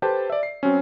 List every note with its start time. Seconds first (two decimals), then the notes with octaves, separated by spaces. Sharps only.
0.02 G4 A4 B4 C5 G5 A5
0.30 D5 E5
0.43 C7
0.63 F#3 C4 C#4